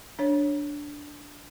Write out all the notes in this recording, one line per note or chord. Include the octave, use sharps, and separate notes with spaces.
D4 C#5